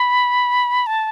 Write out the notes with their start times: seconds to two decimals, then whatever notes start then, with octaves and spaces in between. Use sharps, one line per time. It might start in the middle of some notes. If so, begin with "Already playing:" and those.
Already playing: B5
0.87 A5